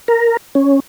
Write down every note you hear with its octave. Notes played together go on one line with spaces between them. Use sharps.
A#4
C#4